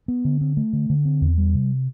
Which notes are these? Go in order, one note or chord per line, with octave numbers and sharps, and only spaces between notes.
B3
D3
C4
A3
D3
D3
C4
E2
G3
C3